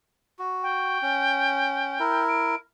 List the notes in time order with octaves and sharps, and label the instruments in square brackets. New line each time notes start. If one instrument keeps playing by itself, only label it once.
[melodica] F#4
[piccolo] G5
[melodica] C#4
E4 A#4
[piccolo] D7